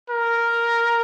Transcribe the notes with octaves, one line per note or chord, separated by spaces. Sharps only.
A#4